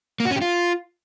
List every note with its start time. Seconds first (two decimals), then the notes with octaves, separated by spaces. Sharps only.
0.20 A#3
0.25 F#4
0.31 C#4
0.36 G4
0.41 F4